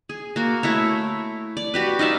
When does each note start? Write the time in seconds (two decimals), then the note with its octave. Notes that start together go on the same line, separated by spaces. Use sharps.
0.09 G#4
0.36 A#3 F#4
0.63 A3 E4 C#5
1.57 D5
1.74 F#4 G4 B4
1.99 D#4 F4 D5 E5